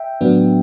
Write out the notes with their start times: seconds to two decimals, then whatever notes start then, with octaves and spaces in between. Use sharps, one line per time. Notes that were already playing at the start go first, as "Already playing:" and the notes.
Already playing: E5 G5
0.21 A2 F#3 B3 D4